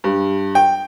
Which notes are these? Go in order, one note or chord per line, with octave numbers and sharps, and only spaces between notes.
G2
G5